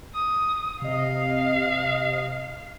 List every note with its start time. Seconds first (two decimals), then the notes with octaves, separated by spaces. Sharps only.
0.15 D#6
0.82 C3 D#5 F5